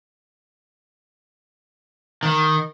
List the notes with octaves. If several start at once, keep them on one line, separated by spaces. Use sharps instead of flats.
D#3